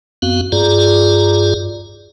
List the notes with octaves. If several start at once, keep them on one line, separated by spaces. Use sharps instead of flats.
F#2 B3 C4 F#4 F5
G2 F4 G#4 D5 A#5